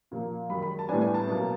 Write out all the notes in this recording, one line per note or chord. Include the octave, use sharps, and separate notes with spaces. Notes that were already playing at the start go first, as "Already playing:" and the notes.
A#2 F3 A#3
F#2 D#3 G#3 B5
B5
A5
A2 E3 G3 B3 D4 G#5
G#5
A5
B2 F#3 A#3